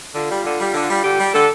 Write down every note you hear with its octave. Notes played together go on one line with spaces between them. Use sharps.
D3 F4
G3
D3
G3
D3
G3
D3 G4
G3
D3 A4